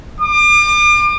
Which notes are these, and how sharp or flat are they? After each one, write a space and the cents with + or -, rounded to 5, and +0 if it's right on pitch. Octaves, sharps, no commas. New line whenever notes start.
D6 +40